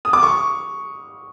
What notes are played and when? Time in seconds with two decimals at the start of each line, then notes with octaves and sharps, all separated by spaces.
0.05 D#6
0.13 D6
0.23 C#6